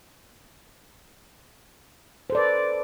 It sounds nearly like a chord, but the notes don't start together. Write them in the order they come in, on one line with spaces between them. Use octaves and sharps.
C5 A4 D5 B4